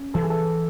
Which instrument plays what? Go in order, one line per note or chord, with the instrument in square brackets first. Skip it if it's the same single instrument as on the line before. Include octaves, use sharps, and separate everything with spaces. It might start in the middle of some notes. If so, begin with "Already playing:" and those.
Already playing: [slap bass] C#4
[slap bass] E3 [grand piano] A4
[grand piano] G#4
A4